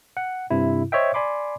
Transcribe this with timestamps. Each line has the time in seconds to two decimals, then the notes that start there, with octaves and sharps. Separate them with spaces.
0.17 F#5
0.50 G2 C3 E4
0.92 C5 C#5 D#5 E5 G5
1.14 D5 G#5 B5 C6 D6